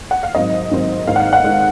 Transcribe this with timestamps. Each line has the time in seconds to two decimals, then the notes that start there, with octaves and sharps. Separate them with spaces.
0.11 F#5
0.23 F5
0.35 G#2 D#3 F#3 C4 D#5
0.72 G#2 D#3 F#3 C4
1.07 G#2 D#3 G#3 F5
1.16 F#5
1.20 F5
1.33 F#5
1.44 D#3 G#3